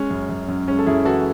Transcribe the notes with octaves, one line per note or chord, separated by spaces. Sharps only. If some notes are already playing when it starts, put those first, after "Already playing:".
Already playing: G#3 C#4
F#2
F#2
F#2
G#3 C#4
A4
F#2 E4 G#4
E3 F#4 A4